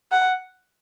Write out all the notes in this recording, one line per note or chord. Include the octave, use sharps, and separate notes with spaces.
F#5